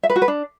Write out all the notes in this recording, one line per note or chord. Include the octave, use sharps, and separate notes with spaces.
E5
B4
F#4
B4
D4